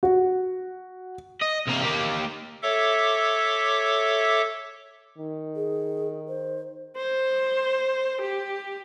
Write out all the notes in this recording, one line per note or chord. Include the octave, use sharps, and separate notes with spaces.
F#4
D#5
C2 A#3
A#3 G4
A4 C#5 E5 D6
D#3
G#4
C5
C5
G4